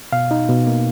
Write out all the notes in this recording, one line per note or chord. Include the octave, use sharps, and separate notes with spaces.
B2 F5
D#4
B2
A#3